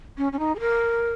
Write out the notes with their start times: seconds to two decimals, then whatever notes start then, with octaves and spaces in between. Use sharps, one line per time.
0.18 C#4
0.32 C#4
0.39 D#4
0.55 G#4
0.60 A#4